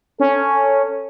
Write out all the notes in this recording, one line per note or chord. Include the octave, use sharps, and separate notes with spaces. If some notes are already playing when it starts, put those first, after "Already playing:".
C#4 A4